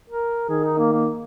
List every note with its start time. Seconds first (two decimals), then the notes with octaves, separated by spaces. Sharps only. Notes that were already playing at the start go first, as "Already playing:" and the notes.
0.10 A#4
0.49 D#3 G#4
0.64 D#4
0.78 A#3
0.93 A#3